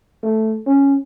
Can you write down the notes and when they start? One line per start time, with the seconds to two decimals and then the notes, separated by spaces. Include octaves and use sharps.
0.23 A3
0.67 C#4